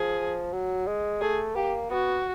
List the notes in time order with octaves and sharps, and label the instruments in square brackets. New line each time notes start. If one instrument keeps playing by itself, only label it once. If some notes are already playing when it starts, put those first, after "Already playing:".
Already playing: [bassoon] F3 [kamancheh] G#4
[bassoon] F#3
G#3
[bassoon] A3 [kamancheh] G#4
[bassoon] A#3 [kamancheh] G4
[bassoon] B3 [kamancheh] F#4